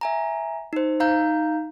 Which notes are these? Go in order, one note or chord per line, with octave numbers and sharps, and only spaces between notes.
E5 G#5 A#5
D#4 C5
D#4 F5 A#5 G6